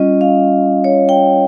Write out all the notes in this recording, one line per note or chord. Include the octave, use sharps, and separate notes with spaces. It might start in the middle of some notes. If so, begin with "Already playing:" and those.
Already playing: G3 C#4 F4 D#5
F5
C#5
G5